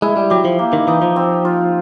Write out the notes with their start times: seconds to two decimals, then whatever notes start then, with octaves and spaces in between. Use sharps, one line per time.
0.02 G#3 E4
0.17 G3
0.30 F#3 G4
0.45 F3
0.59 A#3
0.73 D#3
0.88 E3 D#4
1.02 F3
1.16 C4
1.45 F4